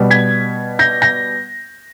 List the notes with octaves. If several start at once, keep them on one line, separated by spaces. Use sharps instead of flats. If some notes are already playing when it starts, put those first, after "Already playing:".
Already playing: B2 G3
G#6 B6
G6 A#6
G6 A#6